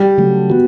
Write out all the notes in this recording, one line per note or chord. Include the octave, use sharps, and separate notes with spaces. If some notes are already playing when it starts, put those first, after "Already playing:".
Already playing: G3
C#3 F#3 A3
B3 F#4